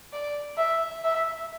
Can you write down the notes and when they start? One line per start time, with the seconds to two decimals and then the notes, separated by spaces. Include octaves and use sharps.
0.13 D5
0.57 E5
1.04 E5